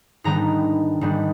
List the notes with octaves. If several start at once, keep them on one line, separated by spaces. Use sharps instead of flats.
G#2 D#3 G3 B3 D4 A#5
G#2 D#3 G3 B3 D4